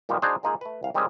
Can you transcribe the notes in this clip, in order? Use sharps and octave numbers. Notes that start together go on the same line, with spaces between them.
A#2 D#3 G3 G#3 A#3 B3
D4 D#4 F#4 G#4 C5 D5
G#3 A#3 D#4 F4 G#4
A3 B4
C2 F5
D#3 G3 G#3 C4 C#4 G#4